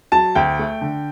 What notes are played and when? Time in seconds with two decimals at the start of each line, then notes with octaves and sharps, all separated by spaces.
0.12 F#3 A5
0.35 D2 G5
0.59 A3
0.81 D3